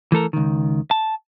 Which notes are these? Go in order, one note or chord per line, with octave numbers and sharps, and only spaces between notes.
E3 A3 A4 A#4
C#2 D#3
A5